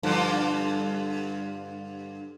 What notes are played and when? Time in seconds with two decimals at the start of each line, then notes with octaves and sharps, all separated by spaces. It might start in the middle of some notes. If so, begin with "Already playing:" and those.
0.03 G2 D3 F3